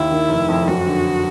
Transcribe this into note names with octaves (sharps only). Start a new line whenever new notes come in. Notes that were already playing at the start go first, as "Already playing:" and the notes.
Already playing: D#2 E4
D#3
F1
F2
F#2 F#4
D3